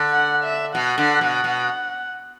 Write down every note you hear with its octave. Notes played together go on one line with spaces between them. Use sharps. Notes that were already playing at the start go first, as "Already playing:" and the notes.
Already playing: D3
F#5
E5
B2 F#5
D3
B2
B2